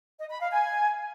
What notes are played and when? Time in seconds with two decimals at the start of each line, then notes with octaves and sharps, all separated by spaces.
0.17 D#5
0.29 B5
0.40 F5
0.51 G#5